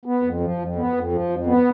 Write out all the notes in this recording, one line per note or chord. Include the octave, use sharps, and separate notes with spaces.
B3
F2
F3
F2
B3
F2
F3
F2
B3